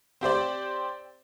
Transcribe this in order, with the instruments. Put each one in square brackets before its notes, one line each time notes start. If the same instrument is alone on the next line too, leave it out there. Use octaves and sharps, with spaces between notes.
[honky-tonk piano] C4 G4 C5 D5